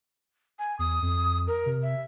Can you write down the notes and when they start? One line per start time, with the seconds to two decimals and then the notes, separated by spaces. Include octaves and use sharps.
0.59 G#5
0.79 E2 D#6
1.02 F2
1.47 A#4
1.66 C3
1.83 E5